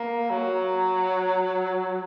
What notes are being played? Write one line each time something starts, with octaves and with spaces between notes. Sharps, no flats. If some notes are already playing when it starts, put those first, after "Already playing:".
Already playing: A#3
F#3